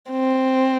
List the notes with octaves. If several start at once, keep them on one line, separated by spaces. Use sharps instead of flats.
C4